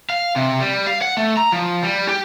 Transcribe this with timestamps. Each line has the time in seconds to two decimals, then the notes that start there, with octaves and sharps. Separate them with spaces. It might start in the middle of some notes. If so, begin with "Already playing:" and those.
0.10 F5
0.36 C3
0.60 G3
0.87 F5
1.02 F#5
1.17 A3
1.37 A#5
1.52 F3
1.83 G3
2.09 G4